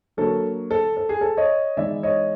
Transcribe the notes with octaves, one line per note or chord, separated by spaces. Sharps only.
D3 F#3 A#3 A4
A4
A4
G#4
A4
C#5 D#5
E3 G#3 B3 D#4 D5 E5
C#5 D#5